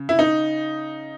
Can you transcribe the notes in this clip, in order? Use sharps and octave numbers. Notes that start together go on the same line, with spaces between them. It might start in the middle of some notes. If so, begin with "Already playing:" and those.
Already playing: C#3
E4
D#4